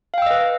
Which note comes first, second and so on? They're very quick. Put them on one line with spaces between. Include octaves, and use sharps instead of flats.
F5 G5 E6 D#5 B4